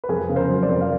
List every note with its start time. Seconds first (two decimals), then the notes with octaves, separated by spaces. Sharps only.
0.04 B4
0.09 F2 G#4 A#4
0.29 C#3
0.36 A#4 C5
0.50 F#3
0.62 C5 D5
0.69 F2
0.81 F5